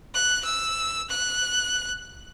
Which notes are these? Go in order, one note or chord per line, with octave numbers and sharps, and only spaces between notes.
F#6
E6
F#6